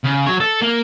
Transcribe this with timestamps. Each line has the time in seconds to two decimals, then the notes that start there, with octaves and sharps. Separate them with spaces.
0.04 C#3
0.27 F#3 C#5
0.40 A4
0.62 A#3